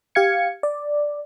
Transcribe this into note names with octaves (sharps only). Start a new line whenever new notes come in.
G4 F5 G#6 C#7
D5